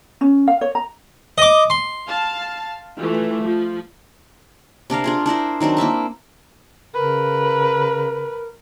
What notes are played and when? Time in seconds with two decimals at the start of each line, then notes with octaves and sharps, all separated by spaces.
0.21 C#4
0.48 F5
0.61 C#5
0.75 A#5
1.38 D#5 D6
1.70 C6
2.07 F5 A5
2.97 E3 A3 F4
3.42 F3
4.90 C3 D4 A#4 F5
5.04 D4 F4 G#4
5.26 D4 E4 A#4 C5
5.60 D#3 F#3 C4 D4
5.77 A#3 E4 E5 A5
6.95 C#3 A#4 B4